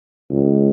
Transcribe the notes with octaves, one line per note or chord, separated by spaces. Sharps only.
C#2